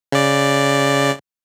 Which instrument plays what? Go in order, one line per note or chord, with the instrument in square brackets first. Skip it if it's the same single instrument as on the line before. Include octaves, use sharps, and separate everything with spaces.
[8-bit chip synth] C#3 D5